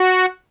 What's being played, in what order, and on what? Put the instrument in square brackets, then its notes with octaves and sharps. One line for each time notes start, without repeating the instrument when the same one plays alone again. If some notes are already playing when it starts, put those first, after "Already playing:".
Already playing: [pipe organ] F#4